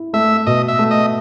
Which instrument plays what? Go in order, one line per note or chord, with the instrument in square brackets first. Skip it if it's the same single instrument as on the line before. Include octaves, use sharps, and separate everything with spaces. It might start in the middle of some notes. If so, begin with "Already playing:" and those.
Already playing: [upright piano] E4
[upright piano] A3 [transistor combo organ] E5
[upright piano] B2 [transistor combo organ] D#5
[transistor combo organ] E5
[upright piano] A3
[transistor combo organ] D#5